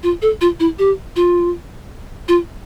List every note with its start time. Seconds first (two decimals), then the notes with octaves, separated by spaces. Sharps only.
0.03 F4
0.22 A4
0.41 F4
0.60 E4
0.79 G4
1.16 F4
2.28 F4